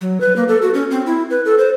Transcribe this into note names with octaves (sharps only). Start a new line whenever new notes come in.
F#3
B4
A#3
A4
F#4
C#4
C4
E4
B4
A4
C5